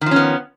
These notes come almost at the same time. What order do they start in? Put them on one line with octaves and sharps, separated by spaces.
D#3 F3 C#4 B3